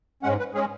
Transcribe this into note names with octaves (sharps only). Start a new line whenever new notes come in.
G#2 G#3 C#4 F#5
B4
G#3 C#4 G#4